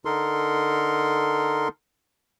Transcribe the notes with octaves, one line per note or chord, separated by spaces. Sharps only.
D3 D#4 A4 A#4 C6